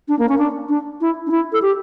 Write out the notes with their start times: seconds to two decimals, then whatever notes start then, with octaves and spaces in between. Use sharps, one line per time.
0.08 D4
0.19 A#3
0.29 C#4
0.38 D4
0.69 D4
1.01 E4
1.27 D4
1.31 E4
1.52 A4
1.62 G4